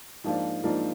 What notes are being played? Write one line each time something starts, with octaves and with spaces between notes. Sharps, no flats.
G#2 F3 A#3 D4 F4
G#2 F3 A#3 D4 F4